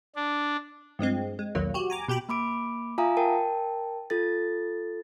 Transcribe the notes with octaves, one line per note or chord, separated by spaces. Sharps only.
D4
G2 F3 G#3 C4
G#3
B1 E2 D#3 F#3 A#3
F#4 G4
G#5 A#5 D6
B2 G4 G5 B5
A#3 B5 D6 D7
F4 E5 F5 G#5 A#5 D#6
A#4 G5 A5
F4 A4 A6